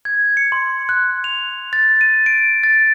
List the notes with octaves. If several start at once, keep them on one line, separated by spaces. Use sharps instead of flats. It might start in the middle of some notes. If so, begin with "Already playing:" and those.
G#6
C#7
C6
F#6
F7
A6
D#7
D7
A6